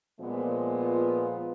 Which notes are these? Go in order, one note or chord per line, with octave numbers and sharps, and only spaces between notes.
A#2 F3 G#3 B3
F4